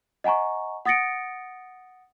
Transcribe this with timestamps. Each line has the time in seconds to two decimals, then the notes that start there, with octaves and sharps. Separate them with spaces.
0.24 D#5 F#5 G#5 A#5 C#6
0.85 F#5 D#6 A6 A#6 C#7 D7